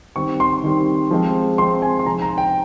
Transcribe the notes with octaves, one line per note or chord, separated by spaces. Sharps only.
D#3 G3 C4 C#6
C6
D#3 G3 C4
F3 G#3 C4
F3 G#3 C4 C6
G#5
C6
C3 F3 C4 D#4 A#5
A#5
G5